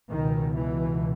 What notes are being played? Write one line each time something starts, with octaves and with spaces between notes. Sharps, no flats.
C#2 B2 D#3
E3